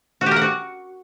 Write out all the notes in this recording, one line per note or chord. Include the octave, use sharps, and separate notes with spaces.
F#4
G4
A#4
F#5
F#4